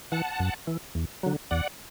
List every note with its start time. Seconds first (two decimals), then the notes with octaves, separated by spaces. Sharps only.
0.12 E3 F#5 A5
0.40 F#2
0.67 E3
0.95 E2
1.23 D3 F#3
1.51 E2 D5 F#5